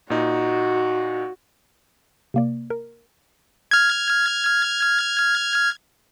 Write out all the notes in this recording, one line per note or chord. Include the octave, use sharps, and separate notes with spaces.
A#2 D#4 F#4
C3 A#3 D5
A#4
F6 G#6